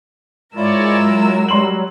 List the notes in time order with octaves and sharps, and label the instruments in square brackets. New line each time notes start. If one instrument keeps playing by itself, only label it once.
[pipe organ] G#2 C#5 D5 [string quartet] G#3 A#4 E6 [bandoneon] E4 F4
[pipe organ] F#3
[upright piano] G3 C6 F#7